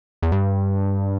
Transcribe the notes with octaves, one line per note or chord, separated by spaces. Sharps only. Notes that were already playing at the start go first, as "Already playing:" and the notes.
E2
G2